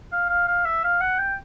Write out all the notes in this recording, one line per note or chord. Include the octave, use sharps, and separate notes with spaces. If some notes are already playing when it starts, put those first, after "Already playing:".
F5
F5
F5
E5
F5
F#5
G5